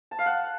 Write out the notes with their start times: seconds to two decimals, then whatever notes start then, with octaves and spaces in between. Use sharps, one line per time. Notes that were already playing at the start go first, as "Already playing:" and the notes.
0.11 A5
0.19 F5
0.26 F#5